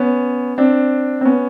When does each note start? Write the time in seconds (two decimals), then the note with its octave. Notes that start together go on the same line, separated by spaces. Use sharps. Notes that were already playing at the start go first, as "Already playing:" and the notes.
Already playing: B3 C#4
0.58 C4 D4
1.21 C4
1.25 B3 C#4